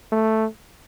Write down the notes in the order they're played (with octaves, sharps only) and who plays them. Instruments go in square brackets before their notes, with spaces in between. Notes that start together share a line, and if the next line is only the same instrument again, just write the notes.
[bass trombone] A3